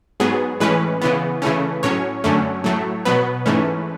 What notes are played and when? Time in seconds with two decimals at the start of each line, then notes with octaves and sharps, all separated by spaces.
0.20 G#2 F#3 B3 G#4
0.60 A2 E3 G#3 C#4 B4
1.01 C#3 E3 B3
1.42 C#3 E3 A3 C#4
1.83 A2 F#3 C#4 C#5
2.24 F#2 D3 F#3 A3 C#4
2.64 A2 F#3 A3
3.05 B2 F#3 B3 B4
3.46 G#2 E3 A3 C#4